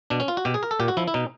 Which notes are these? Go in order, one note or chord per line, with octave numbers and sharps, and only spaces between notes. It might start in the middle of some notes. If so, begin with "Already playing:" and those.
B2 D4
C#4
F4
F#4
B2 G4
G#4
A#4
A4
A#2 G4
F#4
F3 E4
E4
B2 D#4